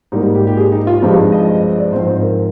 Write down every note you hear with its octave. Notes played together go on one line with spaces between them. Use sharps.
G#2 G3 A#3 D#4
G4
G4
G#4
D#4
F4
G2 F3 G#3 C4 G4
D#4
F4
D#5
D#5
D#5
D5
G#2 F3 C4 C5
C5
A#4